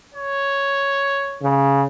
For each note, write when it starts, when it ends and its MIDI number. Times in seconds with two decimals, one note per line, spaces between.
0.14 1.43 73
1.43 1.86 49